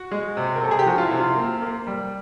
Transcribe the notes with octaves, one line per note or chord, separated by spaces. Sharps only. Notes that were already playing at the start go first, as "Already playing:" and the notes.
Already playing: F#4
G#3
C3
A#4
C3 A4
G#4
G4
F3 F#4
F4
E4
C3
F4
A#3
A#3
G3